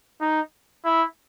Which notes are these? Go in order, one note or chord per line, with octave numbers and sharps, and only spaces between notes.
D#4
E4